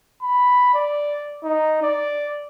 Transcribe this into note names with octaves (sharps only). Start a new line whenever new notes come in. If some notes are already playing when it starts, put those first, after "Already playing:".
B5
D5
D#4
D5